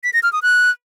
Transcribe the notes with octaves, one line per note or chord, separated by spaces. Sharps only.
B6
A#6
F6
D#6
F#6